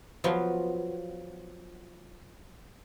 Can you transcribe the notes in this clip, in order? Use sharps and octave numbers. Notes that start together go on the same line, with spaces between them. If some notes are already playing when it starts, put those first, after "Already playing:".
F3 F#3 B3 F4 B4